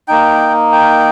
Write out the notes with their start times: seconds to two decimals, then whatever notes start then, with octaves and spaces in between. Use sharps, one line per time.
0.08 A#3 D#4 G5
0.72 G5